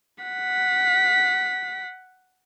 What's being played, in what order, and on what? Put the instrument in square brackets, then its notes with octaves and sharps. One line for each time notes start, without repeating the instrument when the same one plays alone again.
[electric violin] F#5 B6